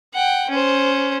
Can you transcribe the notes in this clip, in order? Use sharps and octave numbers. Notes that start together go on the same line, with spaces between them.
F#5 G5
C#4 C5